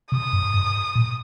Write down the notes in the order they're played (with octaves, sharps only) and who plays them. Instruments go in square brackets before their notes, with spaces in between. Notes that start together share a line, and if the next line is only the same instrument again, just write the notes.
[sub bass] C3 [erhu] D#6
[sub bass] G2
G2
A#2